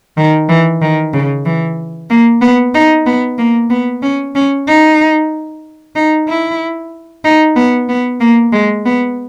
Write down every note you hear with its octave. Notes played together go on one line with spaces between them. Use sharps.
D#3
E3
D#3
C#3
E3
A#3
B3
D#4
B3
A#3
B3
C#4
C#4
D#4
D#4
E4
D#4
B3
B3
A#3
G#3
B3